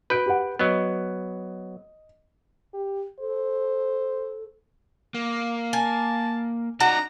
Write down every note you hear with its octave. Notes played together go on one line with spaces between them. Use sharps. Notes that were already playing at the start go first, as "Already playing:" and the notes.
F#4 B4 G6 D7
G4 F#5
F#3 B3 D#5
G4
A4 C5
A#3
G#5 A5
D#4 F#4 D5 A#5